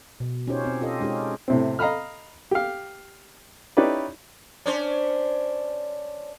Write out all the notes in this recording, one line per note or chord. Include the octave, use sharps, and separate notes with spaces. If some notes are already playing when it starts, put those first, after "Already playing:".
B2
C#4 D#4 F4 G4 C5 C#5
C4
F4 G4 A4 D#5
G#3 C#4 D#4 G4 G#4
A2 C3 C4
D#5 F5 A#5 B5 F6
G4 F5
C#4 D#4 E4 G4 B4 D5
C#4 D4 C5